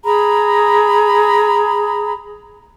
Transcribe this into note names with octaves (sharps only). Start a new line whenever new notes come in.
G#4 A#5 B5